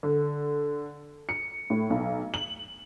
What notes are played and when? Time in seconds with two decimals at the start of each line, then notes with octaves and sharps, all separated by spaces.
0.03 D3
1.29 C#7
1.70 A2
1.90 B1
2.34 F#7